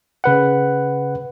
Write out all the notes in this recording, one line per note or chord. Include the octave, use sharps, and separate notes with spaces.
C#3 B4 F#5